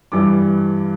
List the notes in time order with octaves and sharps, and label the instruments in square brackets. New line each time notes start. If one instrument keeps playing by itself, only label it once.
[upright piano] G2 E3 G3 D6